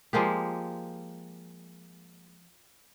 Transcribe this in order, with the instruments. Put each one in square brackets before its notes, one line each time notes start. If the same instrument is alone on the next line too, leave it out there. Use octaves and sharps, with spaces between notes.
[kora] F3 G#3 A#3 G4